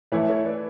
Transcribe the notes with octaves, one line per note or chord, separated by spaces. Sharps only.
E3 A3 E4 C#5 E5
A4 C#5
B4 D5